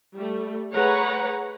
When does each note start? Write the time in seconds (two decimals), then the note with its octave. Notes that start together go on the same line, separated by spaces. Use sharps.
0.15 G3 A3
0.73 A3 G#4 B4 C#5 F#5 A#5